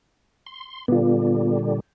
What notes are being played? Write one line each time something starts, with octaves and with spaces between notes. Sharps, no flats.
C6
A#2 D3 G3 B3 F4